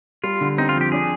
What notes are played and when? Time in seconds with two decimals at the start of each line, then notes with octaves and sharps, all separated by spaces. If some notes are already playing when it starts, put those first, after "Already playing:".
0.24 G3 F4
0.41 D3
0.58 C4 D#4
0.69 F4
0.75 F2
0.81 G4
0.92 D4 G#4